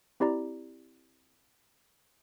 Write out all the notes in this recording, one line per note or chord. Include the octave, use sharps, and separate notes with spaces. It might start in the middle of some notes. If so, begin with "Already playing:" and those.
C4 E4 G4 D5 A#5